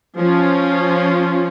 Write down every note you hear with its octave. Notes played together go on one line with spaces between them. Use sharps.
F3 C#4 F4